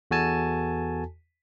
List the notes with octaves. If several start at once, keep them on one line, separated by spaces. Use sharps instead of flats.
E2 F#4 A4 G#5 A5